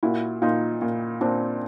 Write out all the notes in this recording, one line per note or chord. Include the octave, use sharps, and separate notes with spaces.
A#2 E4 F#4
A#2 D#4 F4
A#2
A#2 C4 D4